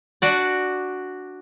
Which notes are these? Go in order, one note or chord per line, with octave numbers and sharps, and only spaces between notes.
D4 F#4 D5